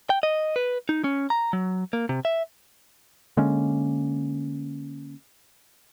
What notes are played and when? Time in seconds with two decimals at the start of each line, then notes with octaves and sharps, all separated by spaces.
0.10 G5
0.23 D#5
0.56 B4
0.89 D#4
1.04 C#4
1.30 A#5
1.53 F#3
1.93 A#3
2.09 C3
2.25 E5
3.37 D3 G#3 A#3 C#4